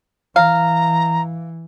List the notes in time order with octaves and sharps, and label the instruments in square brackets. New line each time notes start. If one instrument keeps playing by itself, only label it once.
[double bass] E3 [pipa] F5 [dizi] A#5